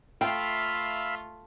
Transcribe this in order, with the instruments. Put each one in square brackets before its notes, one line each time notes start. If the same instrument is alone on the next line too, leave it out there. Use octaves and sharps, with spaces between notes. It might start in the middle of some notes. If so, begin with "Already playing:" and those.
[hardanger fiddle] A3 F4 [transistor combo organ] E5 F5 B5 [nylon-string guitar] G5